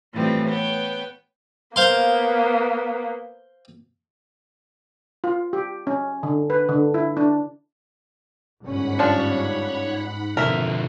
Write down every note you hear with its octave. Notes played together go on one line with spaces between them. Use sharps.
A2 E3 F3 G3 C4
B3 C#5 G5
A#3 B3 C5 F5 C6
F4
G4
C#4
D3
B4
D3
E4
D4
G1 G#2 C#4 F#5 B5
F3 D4 C#5
F2 B2 D3 A#4 E5